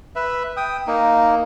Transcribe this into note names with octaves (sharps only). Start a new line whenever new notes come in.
B4 E5
G5 D#6
A#3 D#4